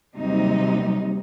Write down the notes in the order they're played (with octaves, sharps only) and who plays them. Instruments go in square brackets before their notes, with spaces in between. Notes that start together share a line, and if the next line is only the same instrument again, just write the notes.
[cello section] D#2 C3 D#4 [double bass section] F#3 G3